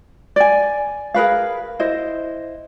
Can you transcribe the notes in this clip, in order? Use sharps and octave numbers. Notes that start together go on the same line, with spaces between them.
D5 G#5
G#4 A#4 B4 F5
E4 C5 D#5